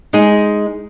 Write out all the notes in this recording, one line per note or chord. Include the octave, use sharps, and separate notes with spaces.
G#3 D#4 G#4